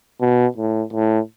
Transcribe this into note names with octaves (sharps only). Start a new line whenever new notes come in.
B2
A2
A2